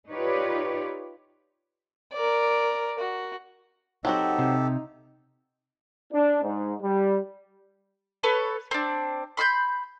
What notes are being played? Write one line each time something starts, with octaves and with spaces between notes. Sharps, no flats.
D#4 F4 G4 B4 C#5 D5
A#4 D5
F#4
F#3 C4 D#4 F#4 G4 A4
C3
D4
G#2
G3
A4 B4 C#5
C4 D4
B5 C6 E6 G6